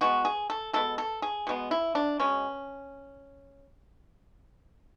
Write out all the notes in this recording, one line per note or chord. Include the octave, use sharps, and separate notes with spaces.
B2 G#3 B3 F#4
G#4
A4
B2 G#3 B3 A4
A4
G#4
B2 G#3 B3
E4
D4
B2 G#3 B3 C#4